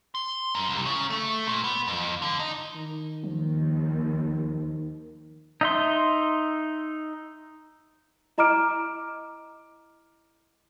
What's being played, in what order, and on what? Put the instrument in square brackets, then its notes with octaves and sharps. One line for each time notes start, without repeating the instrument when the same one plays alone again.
[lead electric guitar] C6
F#2
C2
C#3
A3
A#2
B3
F2
D3
D#4
[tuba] D#3
[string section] D#2 [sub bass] F3
[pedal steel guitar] D#4 E5 C6
[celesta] E4 D#5 A#5 D6 F6 D7